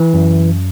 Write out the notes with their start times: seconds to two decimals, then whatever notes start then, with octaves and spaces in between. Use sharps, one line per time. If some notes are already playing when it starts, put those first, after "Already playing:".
Already playing: E3
0.14 F#2